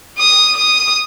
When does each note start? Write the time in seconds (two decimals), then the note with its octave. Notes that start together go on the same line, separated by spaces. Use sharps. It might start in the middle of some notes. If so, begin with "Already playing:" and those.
0.18 D#6
0.57 D#6